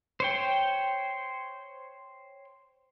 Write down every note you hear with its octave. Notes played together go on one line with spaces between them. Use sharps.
C5 C#5 G5